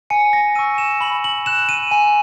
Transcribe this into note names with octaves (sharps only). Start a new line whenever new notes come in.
G#5 C#7
A#6
C#6 E6 D#7
E7
B5 F#7
F#7
F#6 E7
D#7
G#5